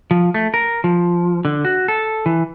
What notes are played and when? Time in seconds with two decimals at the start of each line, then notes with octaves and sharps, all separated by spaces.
0.11 F3
0.34 A3
0.54 A#4
0.84 F3
1.45 D3
1.65 F#4
1.88 A4
2.26 E3